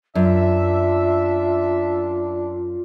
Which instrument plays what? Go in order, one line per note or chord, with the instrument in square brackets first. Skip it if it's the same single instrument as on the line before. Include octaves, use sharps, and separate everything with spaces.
[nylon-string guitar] F#2 [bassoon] D4 [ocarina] F4 [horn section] E5